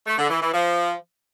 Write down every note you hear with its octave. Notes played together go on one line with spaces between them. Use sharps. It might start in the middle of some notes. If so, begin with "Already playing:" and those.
A3
D3
E3
E3
F3